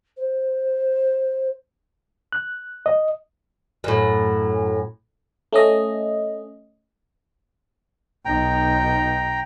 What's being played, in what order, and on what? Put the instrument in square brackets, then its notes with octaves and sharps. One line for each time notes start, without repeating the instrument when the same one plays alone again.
[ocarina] C5
[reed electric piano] F#6
D#5
[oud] F#2 A2
[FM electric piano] A3 C#4 D#5
[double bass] B1 D#4 [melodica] G5 A#5